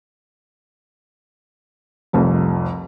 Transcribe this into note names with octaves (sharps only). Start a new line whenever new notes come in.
F1 C2 F2